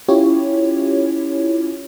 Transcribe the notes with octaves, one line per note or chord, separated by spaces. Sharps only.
C#4 E4 F4 G4 C#5